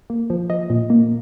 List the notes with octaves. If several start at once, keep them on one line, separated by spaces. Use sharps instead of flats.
A#3
F3
F3 D#5
A#2
A#3